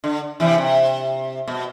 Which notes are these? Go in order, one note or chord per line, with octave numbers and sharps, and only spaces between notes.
D3
C3 E3
C3
B2